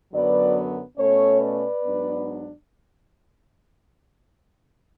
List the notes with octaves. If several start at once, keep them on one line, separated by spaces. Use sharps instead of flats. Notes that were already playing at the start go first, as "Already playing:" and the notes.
F#2 D3 F#3 B3 B4 D5
B2 A3 C#4 A4 C#5
B4 D5
G#2 F#3 B3 D4